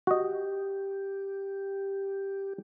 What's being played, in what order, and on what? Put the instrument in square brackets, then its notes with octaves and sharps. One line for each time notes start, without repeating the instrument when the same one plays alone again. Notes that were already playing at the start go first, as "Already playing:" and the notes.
[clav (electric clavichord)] F#4 D#5 [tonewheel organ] G4